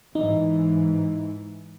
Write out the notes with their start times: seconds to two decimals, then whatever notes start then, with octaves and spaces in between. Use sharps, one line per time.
0.15 G#2 E3 D#4